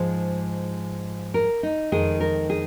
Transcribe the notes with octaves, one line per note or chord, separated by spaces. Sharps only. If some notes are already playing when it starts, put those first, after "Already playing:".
Already playing: G#2 F3 G#3 C5
A#4
D#4
F2 D#3 G#3 G#4
A#4
G#4